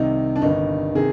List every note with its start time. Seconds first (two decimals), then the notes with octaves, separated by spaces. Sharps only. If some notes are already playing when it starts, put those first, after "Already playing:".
Already playing: C2 C3 D#3 D#4
0.36 D4
0.42 G1 G2 D#3 D#4
0.95 C3 D#3 G#4